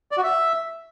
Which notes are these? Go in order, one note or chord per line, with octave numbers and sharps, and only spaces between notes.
D5
F#4
E5